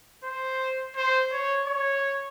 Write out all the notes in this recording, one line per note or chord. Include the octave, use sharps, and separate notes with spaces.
C5
C5
C#5
C#5